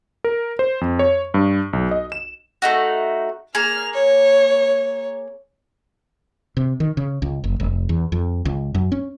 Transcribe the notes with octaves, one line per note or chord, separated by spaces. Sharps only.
A#4
C5
F2
C#5
G2
B1
D#5
E7
A3 D#4 F#4
A#3 G#4 F6 F7
C#5
C3
D#3
C#3
C#2
F#1
F1
E2
F2
C#2
F#2
C#4